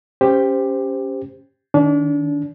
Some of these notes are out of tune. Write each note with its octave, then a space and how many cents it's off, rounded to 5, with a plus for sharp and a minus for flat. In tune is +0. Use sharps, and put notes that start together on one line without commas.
C#4 +0 G4 +10 C5 -10
D#3 +0 D4 -35